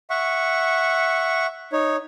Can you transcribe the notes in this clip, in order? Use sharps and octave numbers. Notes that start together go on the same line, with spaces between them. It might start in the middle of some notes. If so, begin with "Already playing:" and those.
E5 F#5 C#6
D#4 C#5